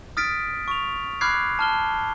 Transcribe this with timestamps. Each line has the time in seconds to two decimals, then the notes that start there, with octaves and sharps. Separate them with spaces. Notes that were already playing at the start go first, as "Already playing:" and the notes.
0.17 D#6 F6 A6 B6 D7
0.68 C#6 F7
1.21 B5 D6 F6 F#6 G#6 C7
1.59 A5 F6 G7